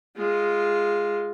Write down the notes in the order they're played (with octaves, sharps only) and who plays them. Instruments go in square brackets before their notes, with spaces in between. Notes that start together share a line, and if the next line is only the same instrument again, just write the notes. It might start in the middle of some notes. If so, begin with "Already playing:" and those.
[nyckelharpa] G#3 F4